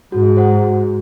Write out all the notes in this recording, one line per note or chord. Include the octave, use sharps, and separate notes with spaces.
G#2 F#4
C5 F#5
F#4